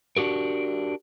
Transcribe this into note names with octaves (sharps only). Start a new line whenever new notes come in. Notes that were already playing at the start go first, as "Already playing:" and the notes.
D4 F#4 G4 A#4